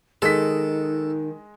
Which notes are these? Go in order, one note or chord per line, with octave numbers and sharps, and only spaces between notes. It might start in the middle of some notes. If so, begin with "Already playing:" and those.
D#3 G#3 D#4 A4 D#5 B6